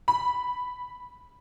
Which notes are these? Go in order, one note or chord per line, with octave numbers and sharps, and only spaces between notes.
B5